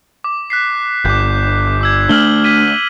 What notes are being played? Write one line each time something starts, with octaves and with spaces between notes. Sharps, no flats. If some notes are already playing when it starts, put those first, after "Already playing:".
D6
F#6 B6 C7
G1 D6 G6
D6 E6 G#6
A3 D4 F6 F#7 G7
G#6 B6 D#7